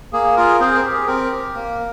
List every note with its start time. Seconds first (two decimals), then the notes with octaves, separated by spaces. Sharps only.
0.13 A#3 G#4
0.36 F4 G#4 A#4
0.60 C4 G#4 C5
0.76 A#4
0.83 G4
0.92 G#4
1.07 C4 A#4
1.31 G4
1.55 A#3